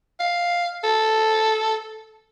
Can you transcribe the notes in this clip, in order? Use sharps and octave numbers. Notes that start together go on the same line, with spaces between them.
F5
A4